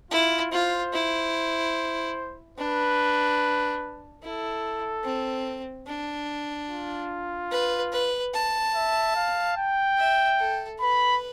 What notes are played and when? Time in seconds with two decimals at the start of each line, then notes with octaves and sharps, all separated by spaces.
0.11 E4 F4
0.52 F4 C5
0.93 E4
2.58 D4 B4
4.22 E4 A4
5.04 C4
5.87 D4
6.69 F4
7.51 B4
7.93 B4
8.34 A5
8.75 E5
9.16 F5
9.57 G5
9.98 E5
10.39 A4
10.80 B4 B5